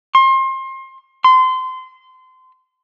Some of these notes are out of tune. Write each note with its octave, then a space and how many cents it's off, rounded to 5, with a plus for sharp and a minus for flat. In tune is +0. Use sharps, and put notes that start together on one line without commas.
C6 +30
C6 -25